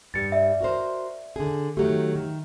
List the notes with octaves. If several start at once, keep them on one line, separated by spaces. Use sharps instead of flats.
G2 G3 A6 C#7
D5 E5
F#4 A#4 C5
D3 G#4
D#3 F#3 A3 G4
D#3